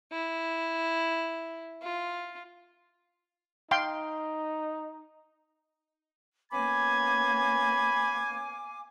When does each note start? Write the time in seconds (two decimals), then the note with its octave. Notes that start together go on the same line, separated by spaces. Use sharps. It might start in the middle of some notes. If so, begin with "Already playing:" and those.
0.12 E4
1.82 F4
3.71 D#4 F5 G5 C6
6.52 A#3 B3 C#4 F5 G#5 B5 D6 G#6